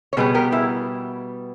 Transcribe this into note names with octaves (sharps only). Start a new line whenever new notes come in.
C#5
B2 G3 B3 G#4 B4
G4 A#4
E4 G#4